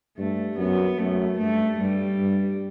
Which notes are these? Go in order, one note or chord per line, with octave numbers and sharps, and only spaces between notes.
G2 A3
F#2 B3
F#2 A3
G2 A3
G2 G3
G2